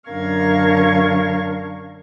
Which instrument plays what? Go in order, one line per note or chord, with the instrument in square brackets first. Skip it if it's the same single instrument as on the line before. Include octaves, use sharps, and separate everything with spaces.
[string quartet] F#2 D3 A#4 F5 C#6 G#6